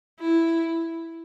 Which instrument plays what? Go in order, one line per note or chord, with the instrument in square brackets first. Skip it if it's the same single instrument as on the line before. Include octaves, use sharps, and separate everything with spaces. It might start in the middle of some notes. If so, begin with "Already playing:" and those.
[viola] E4